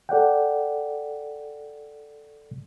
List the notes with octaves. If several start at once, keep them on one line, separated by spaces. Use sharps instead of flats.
A4 D5 F#5 G5